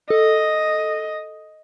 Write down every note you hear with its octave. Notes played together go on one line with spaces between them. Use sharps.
A4 D#5